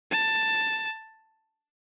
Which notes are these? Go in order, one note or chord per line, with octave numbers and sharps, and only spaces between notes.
A5